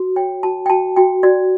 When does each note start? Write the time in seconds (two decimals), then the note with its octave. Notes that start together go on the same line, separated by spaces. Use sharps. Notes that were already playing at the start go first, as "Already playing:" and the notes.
Already playing: F#4
0.16 C#5 G5
0.43 F#4 A5
0.66 G5
0.70 F#4 A5
0.97 F#4 G5
1.23 F#4 D5